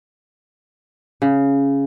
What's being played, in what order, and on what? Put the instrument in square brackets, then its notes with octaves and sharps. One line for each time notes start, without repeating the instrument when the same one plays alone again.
[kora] C#3